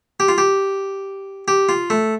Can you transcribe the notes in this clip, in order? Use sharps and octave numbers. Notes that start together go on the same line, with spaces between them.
G4
F4
G4
G4
F4
A3